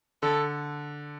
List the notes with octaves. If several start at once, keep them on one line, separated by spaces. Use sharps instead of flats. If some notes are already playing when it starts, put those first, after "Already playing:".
D3 A4